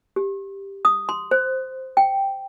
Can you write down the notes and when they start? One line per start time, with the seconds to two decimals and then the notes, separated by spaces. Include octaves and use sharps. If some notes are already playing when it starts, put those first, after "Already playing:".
0.16 G4
0.85 D#6
1.09 C6
1.31 C5
1.97 G5